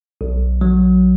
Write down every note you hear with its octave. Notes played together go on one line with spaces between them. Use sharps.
B1
F#3